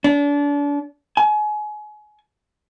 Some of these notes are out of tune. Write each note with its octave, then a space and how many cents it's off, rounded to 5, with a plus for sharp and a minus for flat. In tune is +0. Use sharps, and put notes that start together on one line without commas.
D4 -35
G#5 +30